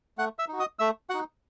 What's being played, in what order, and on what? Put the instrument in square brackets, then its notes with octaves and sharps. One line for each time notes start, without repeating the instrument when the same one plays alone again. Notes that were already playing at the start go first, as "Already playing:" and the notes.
[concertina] A3 F#5 F#6
E5 E6
D#4 F#4
D#5 D#6
A3 E5 E6
D#4 F#4 F#5 F#6